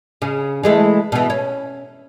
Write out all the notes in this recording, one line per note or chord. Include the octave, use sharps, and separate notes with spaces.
C#3
E3 G#3 A3
B2 E3
C#4